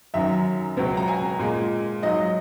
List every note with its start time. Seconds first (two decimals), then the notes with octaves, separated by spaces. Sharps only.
0.14 F#2 D#3 F#3 E5
0.77 C#2 B2 F#3
0.97 A#5
1.08 G#5
1.39 A#2 G#3
2.03 G#2 F#3 D#5